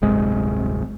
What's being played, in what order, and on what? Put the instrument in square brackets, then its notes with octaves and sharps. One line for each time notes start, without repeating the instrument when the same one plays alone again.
[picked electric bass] D1 G1 C3 G#3